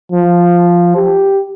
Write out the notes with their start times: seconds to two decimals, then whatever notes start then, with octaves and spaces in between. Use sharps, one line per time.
0.12 F3
0.96 G4